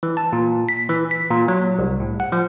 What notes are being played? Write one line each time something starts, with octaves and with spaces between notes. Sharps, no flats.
E3
A5
A#2
B6
E3
B6
A#2
F#3
C2
A2
F#5
F3